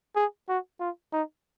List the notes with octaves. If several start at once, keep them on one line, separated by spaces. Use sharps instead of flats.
G#4
F#4
F4
D#4